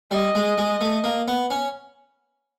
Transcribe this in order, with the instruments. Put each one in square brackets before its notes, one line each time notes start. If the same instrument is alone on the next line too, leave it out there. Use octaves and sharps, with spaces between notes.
[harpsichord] G3 [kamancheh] D#5
[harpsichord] G#3
G#3
A3
A#3
B3
C#4